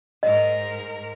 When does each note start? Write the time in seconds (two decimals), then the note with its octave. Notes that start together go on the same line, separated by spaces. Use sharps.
0.23 G#2 A#4 D#5